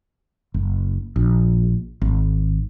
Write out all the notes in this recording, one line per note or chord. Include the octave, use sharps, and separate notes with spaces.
F#1
A#1
G#1